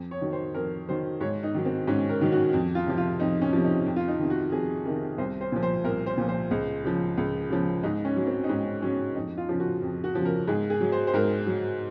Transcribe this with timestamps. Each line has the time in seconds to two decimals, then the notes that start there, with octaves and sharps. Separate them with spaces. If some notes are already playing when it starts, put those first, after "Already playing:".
Already playing: F2
0.11 C#5
0.21 D#3 F#3
0.33 C5
0.54 F2 A#4
0.89 D#3 F#3 C5
1.21 G#2 C#5
1.43 D#4
1.55 D#3 F#3
1.65 C4
1.87 G#2 C#4
2.09 A#4
2.21 D#3 F#3
2.32 F#4
2.53 F2
2.75 F4
2.87 C3 F3
2.97 F4
3.20 F2 D#4
3.42 C#4
3.53 C3 F3
3.64 D#4
3.86 F2
3.96 F4
4.08 D#4
4.19 C3 D#3
4.30 F#4
4.52 F2 G#4
4.85 C3 D#3 A#4
5.18 C2 C5
5.41 C5
5.52 A#2 F3
5.63 C5
5.84 C2 A#4
6.06 C5
6.17 A#2 F3
6.29 C5
6.51 C#2
6.84 C#3 F3
7.18 C#2
7.50 C#3 F3
7.83 G#2 D#4
8.05 C#4
8.16 F#3
8.27 C4
8.44 D#4
8.49 G#2 C#4
8.82 F#3 C#4
9.15 F2 D#4
9.38 F4
9.49 C#3 F3
9.60 F#4
9.82 F2
10.04 F#4
10.15 C#3 F3
10.25 A#4
10.47 G#2 G#4
10.70 G#4
10.80 F#3
10.92 C5
11.07 C5
11.14 G#2 A#4
11.47 F#3